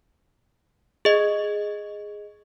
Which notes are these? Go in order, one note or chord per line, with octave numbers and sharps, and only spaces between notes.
G#4 D#5